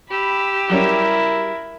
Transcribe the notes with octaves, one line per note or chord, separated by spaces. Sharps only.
G4 B5 E6
F#3 G3 C#4 E4 A#4